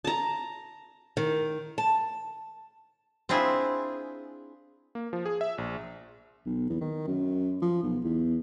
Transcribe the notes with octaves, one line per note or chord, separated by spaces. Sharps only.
A5 A#5
D#3
A5
C4 D4 E4 F4 G#4
A#3
F3
G#4
E5
A#1
B1
E2
D#3
F#2
F3
B1
E2